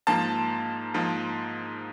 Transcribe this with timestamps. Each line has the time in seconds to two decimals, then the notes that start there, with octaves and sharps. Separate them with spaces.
0.07 G#2 F3 A#3 A5
0.94 G#2 F3 A#3